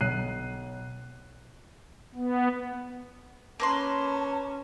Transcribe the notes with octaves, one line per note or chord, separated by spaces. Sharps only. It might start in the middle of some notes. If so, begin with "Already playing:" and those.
B1 F#6 C7 D#7
B3
A#3 C#4 B4 A5 C6